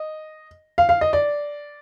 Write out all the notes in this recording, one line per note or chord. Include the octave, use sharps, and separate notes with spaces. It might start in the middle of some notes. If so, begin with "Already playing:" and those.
Already playing: D#5
F5
F5
D#5
D5